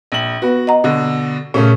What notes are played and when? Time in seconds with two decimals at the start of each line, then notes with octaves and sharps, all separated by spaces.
0.12 A#1 F#7
0.42 B3 F#4 B4
0.67 D#5 F#5 A#5
0.84 B2 D3
1.54 A#2 C#3 A3 C#4